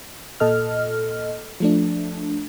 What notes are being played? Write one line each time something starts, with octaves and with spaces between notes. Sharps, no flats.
A#2 A4 D#5 F6
F3 A3 D4